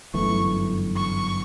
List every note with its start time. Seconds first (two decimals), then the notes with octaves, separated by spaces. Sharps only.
0.14 G1 F#2 E3 A3 C#6
0.96 C#6